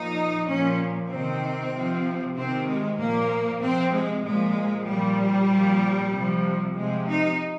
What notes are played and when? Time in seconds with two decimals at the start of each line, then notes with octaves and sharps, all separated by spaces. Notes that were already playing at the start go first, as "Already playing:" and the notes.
Already playing: A#2 F3 D#4
0.47 A#2 F3 C#4
1.09 C3 D#3 C4
1.73 C3 F3
2.35 C3 D#3 C4
2.66 G#3
2.98 A#2 F3 A#3
3.61 C3 F3 C4
3.93 G#3
4.23 A#2 F3 G#3
4.86 A#2 F3 G3
5.50 A#2 F3
6.12 C3 F3
6.75 C3 F3 G#3
7.07 D#4